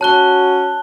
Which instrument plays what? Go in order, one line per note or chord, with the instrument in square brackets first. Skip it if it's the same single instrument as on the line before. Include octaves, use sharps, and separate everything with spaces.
[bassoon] C#4 [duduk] F#4 [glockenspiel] A5 F#6 G7